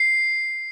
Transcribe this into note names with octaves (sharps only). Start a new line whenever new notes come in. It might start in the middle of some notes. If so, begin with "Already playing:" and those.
Already playing: C7